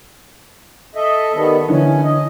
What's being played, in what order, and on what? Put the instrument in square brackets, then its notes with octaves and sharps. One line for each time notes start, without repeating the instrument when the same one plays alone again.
[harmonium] A4 D#5 E5
D#3 G3 B3
[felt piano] D3 E3 [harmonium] C#4
[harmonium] D#5